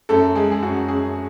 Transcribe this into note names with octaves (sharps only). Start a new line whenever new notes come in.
F#2 A3 A4
G#3 G#4
G#4
F#2 F#4
F#2 G#4